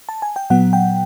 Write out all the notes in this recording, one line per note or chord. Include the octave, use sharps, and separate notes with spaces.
A5
G#5
G5
A#2 F#3 B3 F#5
G5